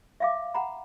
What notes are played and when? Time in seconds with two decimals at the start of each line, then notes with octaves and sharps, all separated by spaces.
0.20 E5 F5 D6
0.54 F#5 A#5 B5